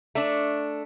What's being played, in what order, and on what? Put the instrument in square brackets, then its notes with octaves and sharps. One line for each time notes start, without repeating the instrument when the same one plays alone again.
[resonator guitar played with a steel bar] A3 D4